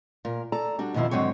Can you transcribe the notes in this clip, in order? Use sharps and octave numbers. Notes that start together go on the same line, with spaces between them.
A#2 A#4
A4 D5 A5 A#5
G3 D4 F#4
F2 B2 D#3 F3 E4 F4
G#2 D3 F#3 C4 C#5